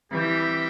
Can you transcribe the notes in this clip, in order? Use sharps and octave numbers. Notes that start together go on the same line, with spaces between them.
E3 G3 C4 G4 E5 G5